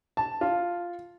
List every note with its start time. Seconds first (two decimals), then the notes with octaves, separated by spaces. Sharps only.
0.17 A5
0.41 F4